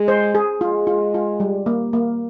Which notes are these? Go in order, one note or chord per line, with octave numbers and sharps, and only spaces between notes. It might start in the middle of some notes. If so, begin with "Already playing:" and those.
Already playing: G#3
C5
G#4
G#3 F4
F4
F4
G3
A#3
A#3